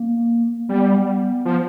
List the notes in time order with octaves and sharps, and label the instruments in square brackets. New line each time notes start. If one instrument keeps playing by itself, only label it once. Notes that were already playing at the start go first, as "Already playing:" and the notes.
Already playing: [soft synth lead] A#3
[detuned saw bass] G3 [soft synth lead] B3
[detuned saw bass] F3